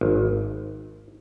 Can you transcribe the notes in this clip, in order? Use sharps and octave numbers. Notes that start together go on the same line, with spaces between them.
G#1